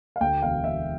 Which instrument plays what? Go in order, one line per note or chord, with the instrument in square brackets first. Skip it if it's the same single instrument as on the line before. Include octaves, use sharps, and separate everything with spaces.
[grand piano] F5
D2 G5
E1 F5
E1 E5